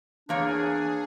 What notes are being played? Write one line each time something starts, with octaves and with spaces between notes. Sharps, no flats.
E2 A#3 D4 G#4 C#5